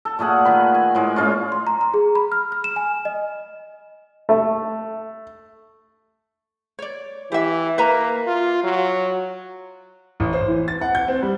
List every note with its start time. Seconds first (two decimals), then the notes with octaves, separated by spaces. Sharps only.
0.05 A4
0.19 A#2 A3 G#4 F#5
0.45 D#3 B4
0.75 G#5
0.95 A2 G#3
1.16 A#2 G#3 C#4 F4
1.52 C6
1.67 A#5
1.81 A#5
1.94 G#4
2.15 B5
2.32 F6
2.52 F6
2.64 E7
2.76 G#5
3.05 D#5
4.29 A3
6.79 C#5 D5
7.32 E3 G4 E5
7.78 A#3 B4 E5 A#5
8.27 F4
8.64 F#3
10.20 A1
10.33 C5
10.48 E3
10.68 A6
10.81 F#5
10.95 G6
11.08 C4
11.22 G3